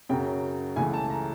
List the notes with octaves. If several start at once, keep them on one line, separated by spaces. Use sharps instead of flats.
F#2 C#3 F#3 G5
C#2 C#3 E3 A3 G#5
A5
A#5